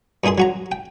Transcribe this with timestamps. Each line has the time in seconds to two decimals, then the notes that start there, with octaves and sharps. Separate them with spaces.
0.24 G2 A#2 D#4 G#4 C6
0.38 F#3 F#4 A#5
0.72 G5